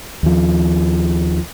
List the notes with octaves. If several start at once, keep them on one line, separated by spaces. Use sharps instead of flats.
D#2 F3